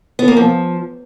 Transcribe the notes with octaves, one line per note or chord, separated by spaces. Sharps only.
B3
A#3
F3